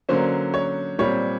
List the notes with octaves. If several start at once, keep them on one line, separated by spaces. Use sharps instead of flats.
D3 F#3 A#3 C#4 C5
C#5
A#2 G3 C4 C#5